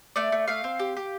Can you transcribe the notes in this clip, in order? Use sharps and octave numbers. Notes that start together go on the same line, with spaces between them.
A3 D5
A3
A3 F5
C4
G4
G4